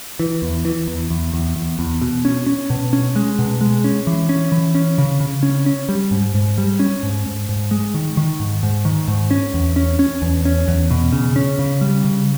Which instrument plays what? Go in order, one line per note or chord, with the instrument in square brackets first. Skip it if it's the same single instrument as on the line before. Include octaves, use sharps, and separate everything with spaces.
[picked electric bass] E3
E2
E3
E2
E2
E2
E2
E2
B2
C#4
C#4
B2
C#4
G#3
B2
G#3
C#4
E3
C#4
E3
C#4
C#3
C#3
C#4
C#4
G3
G#2
G#2
G3
C#4
G#2
G#2
G#2
G#3
D#3
D#3
G#2
G#2
D#3
G#2
C#4
E2
C#4
C#4
E2
C#4
E2
B2
C#3
C#4
C#3
G3
C#3